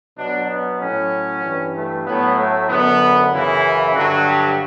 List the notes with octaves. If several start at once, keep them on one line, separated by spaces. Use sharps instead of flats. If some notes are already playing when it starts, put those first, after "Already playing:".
B2 F#3 D4
B3
A2 F#3 C#4
G2 E3
A3
A2 F#3 B3
A3
F#2 D3 F#3 B3
F#2 C#3 E3 E4
G2 D3 F#3 F#4
G4